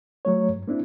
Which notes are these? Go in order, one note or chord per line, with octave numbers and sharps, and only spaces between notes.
F#3 A3 C#5
G2
A#3 C4 D4 E4